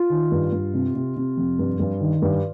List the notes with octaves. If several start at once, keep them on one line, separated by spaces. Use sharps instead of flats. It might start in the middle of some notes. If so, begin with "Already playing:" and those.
Already playing: F4
D#3
G2
G2
C3
C3
C3
F2
G2
G2
D#3
G2